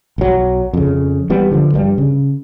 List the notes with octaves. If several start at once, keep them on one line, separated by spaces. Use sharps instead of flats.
B1 F#3
F2 C#3
E3 G3 B3
D3 F3
D2 G2 G3
C#3